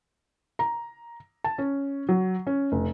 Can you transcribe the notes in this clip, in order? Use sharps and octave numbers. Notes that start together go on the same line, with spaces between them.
A#5
A5
C#4
F#3
C#4
F1